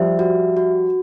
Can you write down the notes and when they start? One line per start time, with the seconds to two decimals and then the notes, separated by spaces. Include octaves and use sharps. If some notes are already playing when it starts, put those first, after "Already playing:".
Already playing: F3 G3 C5 E5
0.19 F#4
0.57 F#4